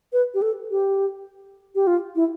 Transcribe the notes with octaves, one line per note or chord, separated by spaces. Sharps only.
B4
G4
A4
G4
G4
F4
E4